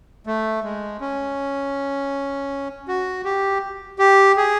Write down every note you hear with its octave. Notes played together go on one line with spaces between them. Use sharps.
A3
G#3
C#4
F#4
G4
G4
G#4